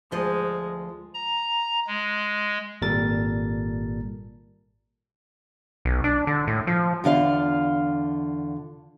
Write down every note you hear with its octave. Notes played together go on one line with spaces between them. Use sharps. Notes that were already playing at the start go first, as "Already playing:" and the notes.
D2 F3 G#3 D#5
A#5
G#3
G#1 A#2 G3 A4 A#4 A6
B1
D4
D3
A2
F3
E2 D3 F4 F5